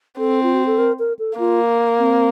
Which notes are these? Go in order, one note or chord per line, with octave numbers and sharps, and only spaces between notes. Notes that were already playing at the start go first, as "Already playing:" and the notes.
C4 A4
F4
F#4
A4
A#4
A#4
A4
A#3 F4
C4